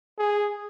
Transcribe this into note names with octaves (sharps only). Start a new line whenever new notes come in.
G#4